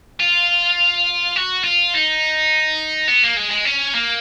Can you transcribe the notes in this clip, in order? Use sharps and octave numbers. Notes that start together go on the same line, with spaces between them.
F4
F#4
F4
D#4
B3
A#3
G#3
G#3
C#4
A#3